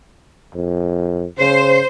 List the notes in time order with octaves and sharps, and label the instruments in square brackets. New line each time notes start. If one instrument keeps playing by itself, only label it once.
[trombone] F2
[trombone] C#3 [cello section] C5